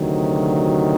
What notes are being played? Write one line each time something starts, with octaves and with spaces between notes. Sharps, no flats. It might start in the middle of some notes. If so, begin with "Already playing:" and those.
Already playing: D2 C3 D#3 F#3